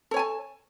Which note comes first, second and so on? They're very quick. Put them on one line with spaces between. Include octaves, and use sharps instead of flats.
A4 C#5 G#5 A5